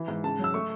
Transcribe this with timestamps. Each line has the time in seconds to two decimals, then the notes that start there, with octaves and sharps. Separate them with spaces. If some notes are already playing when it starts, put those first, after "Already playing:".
Already playing: E3
0.08 G#2
0.24 C#3 A5
0.39 F#3 E6
0.54 A3 C#6